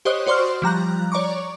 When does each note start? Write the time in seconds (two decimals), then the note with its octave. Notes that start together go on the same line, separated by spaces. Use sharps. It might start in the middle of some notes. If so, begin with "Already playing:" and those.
0.05 G4 C5 C#5 D#5 D#6 F#6
0.27 F#4 C5 D5 C6 C#6 F6
0.62 F3 G3 A#5 F#6
1.12 C#5 D5 A#5 C#6 D6